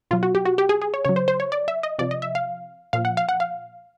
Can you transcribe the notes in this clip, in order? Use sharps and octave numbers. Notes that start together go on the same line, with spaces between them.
B2 F#3 F4
F#4
G4
F#4
G4
G#4
G#4
C#5
C#3 F#3 C#5
C5
C5
C#5
D5
E5
D#5
C3 F3 D5
D#5
E5
F5
A#2 F3 F5
F#5
F5
F#5
F5